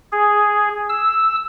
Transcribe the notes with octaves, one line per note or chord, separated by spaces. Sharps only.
G#4
E6